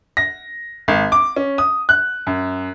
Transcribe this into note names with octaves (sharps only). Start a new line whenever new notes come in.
A#6
G#1
D6
C#4
D#6
F#6
F#2